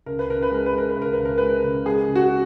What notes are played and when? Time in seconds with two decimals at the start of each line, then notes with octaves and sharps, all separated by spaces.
0.06 C#2 A#4
0.19 B4
0.29 C#3 A#4
0.42 B4
0.51 G#3 A#4
0.66 B4
0.74 G#3 A#4
0.90 B4
0.96 C#2
1.02 A#4
1.13 C#3 B4
1.25 A#4
1.38 G#3 B4
1.49 A#4
1.64 C#3
1.85 G#3 G#4
2.08 C#3
2.15 F#4